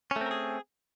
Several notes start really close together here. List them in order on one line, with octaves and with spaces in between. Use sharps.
C#4 A3 C4 A#4 G#4